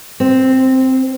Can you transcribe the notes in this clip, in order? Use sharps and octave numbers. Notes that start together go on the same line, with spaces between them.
C4